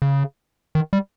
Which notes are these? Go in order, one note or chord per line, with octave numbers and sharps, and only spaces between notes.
C#3
D#3
G3